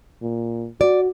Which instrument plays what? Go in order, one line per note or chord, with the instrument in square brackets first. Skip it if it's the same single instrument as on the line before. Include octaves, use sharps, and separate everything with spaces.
[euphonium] A#2
[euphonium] F#4 [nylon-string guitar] D5